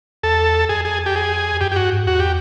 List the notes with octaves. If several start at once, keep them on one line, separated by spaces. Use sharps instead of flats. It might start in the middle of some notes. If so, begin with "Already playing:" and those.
E2 A4
F2 G#4
G#4
G4
G#4
F#2 G4
G4
G2 F#4
G#2
E2 F#4
G4